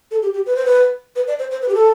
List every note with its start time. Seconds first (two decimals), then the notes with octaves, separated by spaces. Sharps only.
0.11 A4
0.22 G4
0.34 G4
0.46 B4
0.56 C5
0.66 B4
1.16 B4
1.27 D5
1.39 C5
1.51 C5
1.62 B4
1.68 G4
1.74 A4